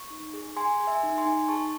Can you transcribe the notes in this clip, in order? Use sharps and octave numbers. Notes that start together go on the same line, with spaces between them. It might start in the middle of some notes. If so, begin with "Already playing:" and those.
Already playing: C#6
D#4
G#4
G#4 G#5 C6
G#4
E5 G#5
D#4
G#5 C6
D#4
G#4 A5 C#6